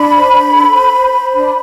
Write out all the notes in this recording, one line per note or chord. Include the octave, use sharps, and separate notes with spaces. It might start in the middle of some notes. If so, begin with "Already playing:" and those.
Already playing: D4 B5
C5
D4
A4
C5
C5
C5
D4